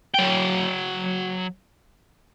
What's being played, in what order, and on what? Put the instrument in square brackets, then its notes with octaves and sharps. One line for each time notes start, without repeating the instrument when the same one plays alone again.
[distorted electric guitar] F#3 G5